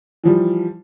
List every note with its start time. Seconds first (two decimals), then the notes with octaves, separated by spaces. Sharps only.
0.24 E3 F3 G3